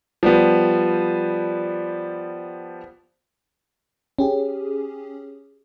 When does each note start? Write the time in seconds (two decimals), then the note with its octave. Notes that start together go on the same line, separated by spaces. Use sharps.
0.23 F3 G3 B3
4.19 C#4 G4 G#4